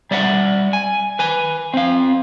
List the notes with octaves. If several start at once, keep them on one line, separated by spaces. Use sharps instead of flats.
G3 D5 E5 F#5
G#5
B4 G#5
C4 F5